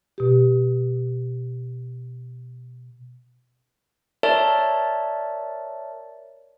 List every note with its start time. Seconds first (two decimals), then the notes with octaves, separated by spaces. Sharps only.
0.18 B2 G4
4.23 A#4 C#5 D5 E5 A5